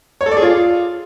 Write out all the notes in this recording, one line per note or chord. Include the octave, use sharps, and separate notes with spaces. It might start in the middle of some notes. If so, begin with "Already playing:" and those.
C#5
A4
D5
G#4
F4